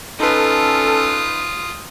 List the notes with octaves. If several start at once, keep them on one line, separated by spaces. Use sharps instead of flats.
C#4 D#4 F4 A4 B4 D#6